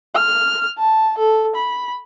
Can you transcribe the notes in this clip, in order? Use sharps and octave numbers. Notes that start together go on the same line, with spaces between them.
F6
A5
A4
B5